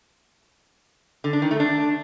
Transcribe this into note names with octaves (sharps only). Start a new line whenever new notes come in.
D3
D4
D#3
A3
D4